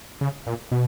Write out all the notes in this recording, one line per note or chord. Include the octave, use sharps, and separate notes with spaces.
C#3
A#2
B2